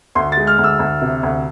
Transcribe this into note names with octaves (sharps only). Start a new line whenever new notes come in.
D2 C6
A6
G#3
F6
D2
E6
D2
C3
D2